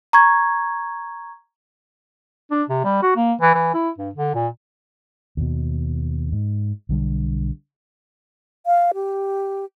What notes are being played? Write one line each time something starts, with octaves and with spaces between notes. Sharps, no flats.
A#5 C#6 G#6
D4
C3
G3
F#4
A#3
E3
E3
E4
G2
D3
A#2
D#2 B2
G#2
B1 D3 G3
F5
G4